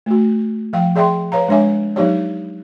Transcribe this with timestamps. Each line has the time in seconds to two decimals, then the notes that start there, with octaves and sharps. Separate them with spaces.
0.06 A3 F#4
0.73 F3 F5 G5
0.96 G#4 D5 E5 G5 C6
1.32 B4 C#5 F5 A#5
1.48 G#3 D4 C#5 E5 G#5
1.96 F#3 B3 D#4 G4 C#5 D5